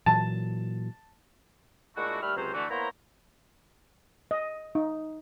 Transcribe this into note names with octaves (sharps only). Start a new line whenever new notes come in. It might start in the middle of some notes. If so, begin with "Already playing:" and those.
A#2 E3 F#3 A5
A#2 G#3 A3 D4 E4 F#4
D#2 G3 A3 E5 B5 F6
C#2 C3 F#3 C#4 C5
D3 E3 A3 F#4
A#3 B3 E4 C5 C#5 A#5
D#5
D#4